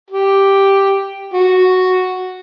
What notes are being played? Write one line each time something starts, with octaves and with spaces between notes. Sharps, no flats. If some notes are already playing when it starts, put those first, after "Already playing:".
G4
F#4